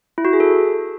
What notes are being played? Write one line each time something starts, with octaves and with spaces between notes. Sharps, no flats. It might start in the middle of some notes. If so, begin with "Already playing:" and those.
E4
F#4
G#4
A4